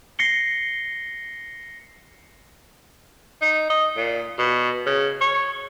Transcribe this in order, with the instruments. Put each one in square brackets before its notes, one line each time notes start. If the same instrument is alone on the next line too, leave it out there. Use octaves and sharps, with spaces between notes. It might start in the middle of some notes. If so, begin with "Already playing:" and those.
[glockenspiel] A#6 C7 C#7 G7
[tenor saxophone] D#4
D#5
A#2
B2
C#3
C#5